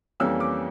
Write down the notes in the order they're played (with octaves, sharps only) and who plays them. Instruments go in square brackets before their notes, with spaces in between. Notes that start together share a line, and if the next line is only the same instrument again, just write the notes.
[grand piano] F2 E3 G3 A#3 C#4 E6
D6